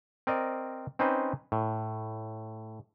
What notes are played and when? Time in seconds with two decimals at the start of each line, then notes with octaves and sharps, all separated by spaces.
0.27 C4 A#4 D5 D#5
0.99 C4 C#4 D#4 B4 C5
1.52 A2